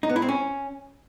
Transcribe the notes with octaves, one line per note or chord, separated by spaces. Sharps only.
D#4
B3
E4
C4
C#4